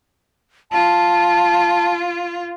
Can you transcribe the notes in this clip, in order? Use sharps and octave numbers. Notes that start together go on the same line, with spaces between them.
F4 A5